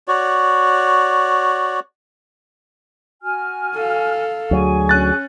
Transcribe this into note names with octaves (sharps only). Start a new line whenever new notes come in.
F#4 C#5 D5
F#4 G#5 F6
A4 F5
D2 F#3 G#4 G#5 C#6
C#4 F#6 A6